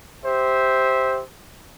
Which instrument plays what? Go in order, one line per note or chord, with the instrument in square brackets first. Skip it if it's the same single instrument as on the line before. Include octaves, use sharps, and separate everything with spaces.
[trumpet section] G4 C5 E5